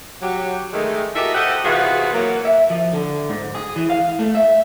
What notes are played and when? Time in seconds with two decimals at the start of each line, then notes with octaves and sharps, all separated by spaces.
0.22 F#3 G4
0.73 D#3 G#3 A3
1.15 F#4 G4 A4 A#4 D#5 E5
1.34 G4 A4 C5 D#5 F#5
1.64 C3 E3 B3 F4 F#4 G#4
2.14 F#3 A#3
2.45 E5
2.70 F3
2.92 D3
3.29 G#2
3.55 G#4
3.76 E3
3.90 F5
4.19 A3
4.35 E5